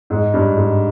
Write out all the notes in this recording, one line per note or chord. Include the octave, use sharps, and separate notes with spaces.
G#2
G2
G#2